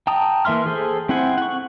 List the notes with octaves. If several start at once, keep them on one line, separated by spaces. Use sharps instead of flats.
G5 A5 A#5 D#6
E3 A#3 E5 C6 F6
G#4 A4 C5
C4 E4 C5 F#5 G#5
F#5 C#6